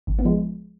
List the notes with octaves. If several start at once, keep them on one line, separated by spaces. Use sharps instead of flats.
G#1
B3
F3 G#3